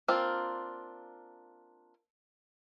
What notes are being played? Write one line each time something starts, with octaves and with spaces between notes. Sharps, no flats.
A#3 C4 D4 F4